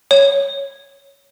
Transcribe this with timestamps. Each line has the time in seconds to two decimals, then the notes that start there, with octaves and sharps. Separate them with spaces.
0.11 C#5